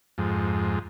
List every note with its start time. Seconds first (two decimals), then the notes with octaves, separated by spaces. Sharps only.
0.18 F2 G#2